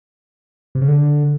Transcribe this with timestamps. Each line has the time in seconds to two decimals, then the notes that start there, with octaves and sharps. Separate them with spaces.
0.75 C3
0.82 C#3
0.88 D3